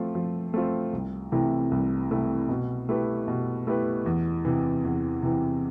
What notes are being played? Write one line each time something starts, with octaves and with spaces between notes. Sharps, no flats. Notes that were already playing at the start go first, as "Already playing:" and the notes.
Already playing: F3 A3 C4 F4
F3
A3 C4 F4
C2
C3 E3 A3 E4
C2
C3 E3 A3 E4
B2
A3 E4 G4 B4
B2
A3 E4 G4 B4
E2
C3 E3
E2
C3 E3